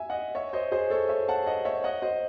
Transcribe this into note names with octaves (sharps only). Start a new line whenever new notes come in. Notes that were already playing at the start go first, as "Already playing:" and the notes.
Already playing: E5 G#5
D#5 F#5
C#5 E5
C5 D#5
G#4 C5
A4 C#5
C#5 E5
F#5 A5
D#5 F#5
C#5 E5
D#5 F#5
C5 D#5